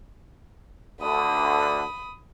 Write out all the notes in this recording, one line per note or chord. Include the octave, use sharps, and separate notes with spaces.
D2 D3 B5 D#6